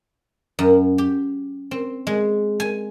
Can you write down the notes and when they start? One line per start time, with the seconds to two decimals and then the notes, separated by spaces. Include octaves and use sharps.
0.59 F#2
0.98 G4
1.71 C4
2.07 G#3
2.60 G#5